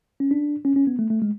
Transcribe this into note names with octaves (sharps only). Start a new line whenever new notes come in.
C#4
D4
C#4
C#4
B3
A3
A3
G#3